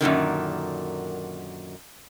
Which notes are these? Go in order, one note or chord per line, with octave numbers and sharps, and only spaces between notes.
F#2 A#2 D3 D#3